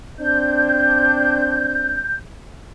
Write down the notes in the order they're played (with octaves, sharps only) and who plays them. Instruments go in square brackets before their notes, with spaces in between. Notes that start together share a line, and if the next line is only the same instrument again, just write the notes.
[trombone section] C4 D4 [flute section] G6